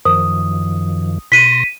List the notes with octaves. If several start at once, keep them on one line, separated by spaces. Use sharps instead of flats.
F#2 D#3 F3 D#6
B2 C6 A#6 B6 D#7